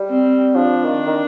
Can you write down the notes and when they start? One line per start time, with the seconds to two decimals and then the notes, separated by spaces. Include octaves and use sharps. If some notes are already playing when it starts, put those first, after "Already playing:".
Already playing: G3
0.10 C4
0.55 F3 D4
0.85 D#3
1.07 D#3